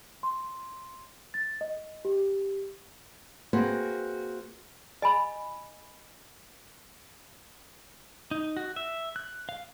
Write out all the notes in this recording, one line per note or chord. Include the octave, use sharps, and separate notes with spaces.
C6
A6
D#5
G4
A#3 C4 F#4 G#4 B4
D#5 G#5 B5
D#4
F#4
E5
F#6
F5